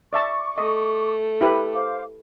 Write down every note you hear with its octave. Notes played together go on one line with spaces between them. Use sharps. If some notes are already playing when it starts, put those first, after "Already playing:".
D5 E5 A5 C#6 D6
A3 D#5
E4 G4 B4
C5 F5 D6